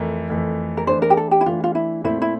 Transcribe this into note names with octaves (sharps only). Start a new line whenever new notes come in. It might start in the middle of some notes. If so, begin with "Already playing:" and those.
Already playing: F2 E3 A3 A#4
F2 E3 A3
A#4
E3 A3 D4 C5
A#4
G4
A4
G4
E4
E3 A3 D4 F4
F4
E4
A#2 A3 C4 E4
E4